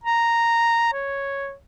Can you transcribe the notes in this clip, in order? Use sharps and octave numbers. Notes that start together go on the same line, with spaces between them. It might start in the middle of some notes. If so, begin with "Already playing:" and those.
A#5
C#5